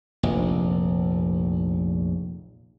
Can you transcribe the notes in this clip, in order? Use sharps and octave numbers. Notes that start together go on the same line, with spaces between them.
F1 A#1